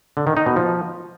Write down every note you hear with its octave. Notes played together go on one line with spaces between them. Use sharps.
D3
D#3
D#4
B2
F3